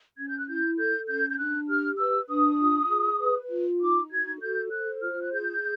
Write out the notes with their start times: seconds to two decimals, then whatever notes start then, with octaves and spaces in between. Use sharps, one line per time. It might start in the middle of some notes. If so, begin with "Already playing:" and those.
0.17 C#4 G#6
0.28 G6
0.38 F#6
0.48 E4 G6
0.77 A4 G6
1.08 C#4 G6
1.30 G6
1.38 D4 F#6
1.69 G4 F6
1.99 B4 E6
2.29 D4 D#6
2.60 F4
2.90 G#4
3.19 B4
3.51 F4
3.80 D#4 D6
4.11 F#4 G#6
4.41 A4 G6
4.71 C5 F#6
5.01 F4 F6
5.22 F#6
5.32 G#4 G6